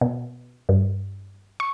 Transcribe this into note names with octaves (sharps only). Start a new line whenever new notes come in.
B2
G2
C#6